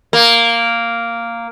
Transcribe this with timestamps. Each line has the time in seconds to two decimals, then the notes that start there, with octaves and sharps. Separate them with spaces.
0.13 A#3